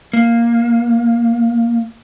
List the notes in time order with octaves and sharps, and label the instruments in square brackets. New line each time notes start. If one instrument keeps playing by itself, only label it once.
[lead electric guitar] A#3